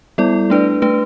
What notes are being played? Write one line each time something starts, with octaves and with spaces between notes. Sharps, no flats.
G3 B3 E4 A4 D5
A3 D4 B4 D5
A3 D4 B4